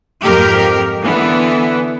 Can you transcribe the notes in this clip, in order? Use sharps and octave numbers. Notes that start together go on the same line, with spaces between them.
F2 G#2 G4 A#4
D3 E3 B3